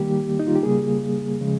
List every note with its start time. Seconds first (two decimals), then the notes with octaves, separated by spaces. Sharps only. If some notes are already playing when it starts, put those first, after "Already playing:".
Already playing: D#3 G3 A#3 G4
0.40 D#4
0.47 F4
0.56 G4
0.63 C#3 G3 A#3 G#4
1.41 C#3 F3 G#3